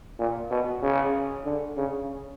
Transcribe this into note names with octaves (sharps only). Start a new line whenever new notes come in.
A#2
B2
C#3
D3
C#3